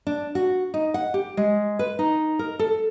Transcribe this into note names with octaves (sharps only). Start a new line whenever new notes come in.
D4
F#4
D#4
F#5
G4
G#3
B4
D#4
A#4
A4